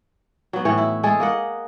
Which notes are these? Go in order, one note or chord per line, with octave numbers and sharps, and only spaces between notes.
F#3 B3
A2 E3 C#5
E4
G#3 G#4 A4
A#3 D#5 F#5